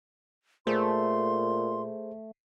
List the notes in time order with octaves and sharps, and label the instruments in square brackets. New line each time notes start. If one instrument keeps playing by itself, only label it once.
[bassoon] A#2 [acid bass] A3 [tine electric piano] G#4 C5 [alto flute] C6